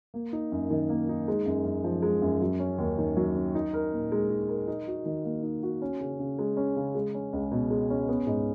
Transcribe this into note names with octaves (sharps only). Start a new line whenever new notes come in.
A#3
D#4
F#2
D#3
A#3
D#4
G#3
F#2
F#2
F3
G#3
F#2
F#3
C#4
D#2
D#3
F#3
C#4
D#4
A#4
A#2
G#3
D#4
A#4
D#4
F#4
D#3
A#3
D#4
F#4
C#4
C#3
C#3
G#3
C#4
C#3
G#3
C#4
C#2
B2
G#3
C#4
B3
G#2